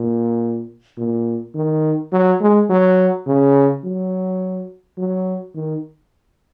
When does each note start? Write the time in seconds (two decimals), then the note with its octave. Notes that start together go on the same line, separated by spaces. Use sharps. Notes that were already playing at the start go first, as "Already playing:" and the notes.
Already playing: A#2
0.98 A#2
1.55 D#3
2.12 F#3
2.41 G#3
2.69 F#3
3.27 C#3
3.84 F#3
4.98 F#3
5.55 D#3